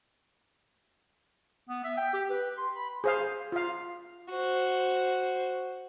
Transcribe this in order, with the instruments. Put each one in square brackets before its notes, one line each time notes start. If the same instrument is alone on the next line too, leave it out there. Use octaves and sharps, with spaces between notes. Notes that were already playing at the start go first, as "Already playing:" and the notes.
[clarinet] B3
E5
G5
G4
B4
C6
B5
[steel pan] G#4 C5 F5
F4 F5
[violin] F#4 C5